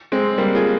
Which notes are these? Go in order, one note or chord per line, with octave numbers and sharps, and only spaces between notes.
G#3 C4
G3 A#3
F4 G#4